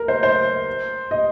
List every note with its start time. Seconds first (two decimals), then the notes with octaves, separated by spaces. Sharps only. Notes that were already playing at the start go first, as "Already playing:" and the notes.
Already playing: A#4
0.08 C5
0.23 C5
1.11 D#5